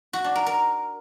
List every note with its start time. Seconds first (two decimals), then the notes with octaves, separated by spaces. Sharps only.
0.13 F#4
0.24 D4
0.35 A#4
0.46 A#4